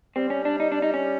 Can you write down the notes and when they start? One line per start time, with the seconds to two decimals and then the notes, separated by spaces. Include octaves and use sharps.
0.16 G3 C4
0.30 C#4
0.45 D4
0.60 D#4
0.72 D4
0.82 D#4
0.94 C#4